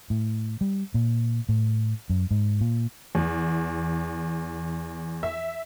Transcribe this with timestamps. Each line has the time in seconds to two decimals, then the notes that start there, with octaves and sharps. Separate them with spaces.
0.10 A2
0.61 G3
0.94 A#2
1.49 A2
2.10 F#2
2.31 G#2
2.61 A#2
3.15 E2
5.23 E5